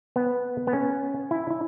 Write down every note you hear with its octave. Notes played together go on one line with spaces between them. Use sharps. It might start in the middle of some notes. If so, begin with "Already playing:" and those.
B3
B3
C#4
E4
E4